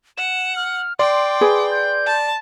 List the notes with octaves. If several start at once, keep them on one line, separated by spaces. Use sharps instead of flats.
F#5 E7
F6
D5 G5 C6 D6
G#4 B4
G6
A5